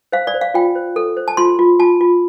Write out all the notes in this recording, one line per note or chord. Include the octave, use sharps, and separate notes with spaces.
C5 F5
D5
C5
F5
F4 G5
C5
A4
C5
A5
F4 C6
F4
F4 A5
F4